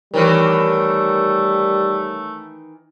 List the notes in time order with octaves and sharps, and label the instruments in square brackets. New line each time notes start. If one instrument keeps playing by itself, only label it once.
[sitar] D#3 E3 [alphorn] G3 [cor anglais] A3 [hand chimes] A#4 C#5 F6